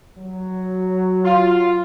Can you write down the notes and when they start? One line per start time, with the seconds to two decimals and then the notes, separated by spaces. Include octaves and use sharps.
0.18 F#3
1.23 F4